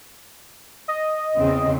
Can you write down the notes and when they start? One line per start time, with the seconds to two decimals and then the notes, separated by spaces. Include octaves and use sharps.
0.88 D#5
1.37 E2 C#3 C4